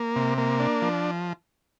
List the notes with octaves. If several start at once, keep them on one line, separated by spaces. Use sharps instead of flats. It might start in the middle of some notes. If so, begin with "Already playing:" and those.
Already playing: A#3
C3
A#3
D4
F3